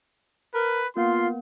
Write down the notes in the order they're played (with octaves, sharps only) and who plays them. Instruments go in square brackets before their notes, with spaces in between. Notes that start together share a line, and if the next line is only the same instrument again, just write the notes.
[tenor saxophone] A#4 [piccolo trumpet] B4
[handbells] A#3 B3 [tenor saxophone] F4 [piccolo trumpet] C6